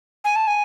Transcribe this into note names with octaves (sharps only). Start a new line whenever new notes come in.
G#5
A5
G#5